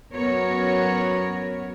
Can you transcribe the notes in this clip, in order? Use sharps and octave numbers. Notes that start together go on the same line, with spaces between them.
F#2 B3 F#4 A#4 C#5